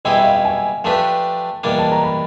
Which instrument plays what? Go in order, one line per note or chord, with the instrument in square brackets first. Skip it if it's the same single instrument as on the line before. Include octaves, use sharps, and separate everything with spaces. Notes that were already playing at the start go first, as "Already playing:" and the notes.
[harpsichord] B2 G3 C4 E4 G#4 [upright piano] D#5
[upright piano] E5
F5
E5
G#5
[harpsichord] F3 A3 D4 G4 B4 [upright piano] A5
[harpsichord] E2 B2 G3 A#3 D4
[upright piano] A5
A#5
B5